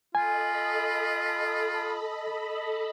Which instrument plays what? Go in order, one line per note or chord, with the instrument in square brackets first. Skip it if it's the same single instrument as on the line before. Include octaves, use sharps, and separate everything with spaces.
[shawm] F4 [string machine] A4 D#5 B5 [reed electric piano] G#5